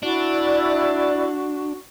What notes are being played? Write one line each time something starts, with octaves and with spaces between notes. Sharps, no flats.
D4 E4 F#4 D5